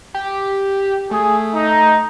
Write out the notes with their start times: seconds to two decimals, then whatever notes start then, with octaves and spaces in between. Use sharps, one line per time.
0.14 G4
1.11 A3 G#4
1.55 D#4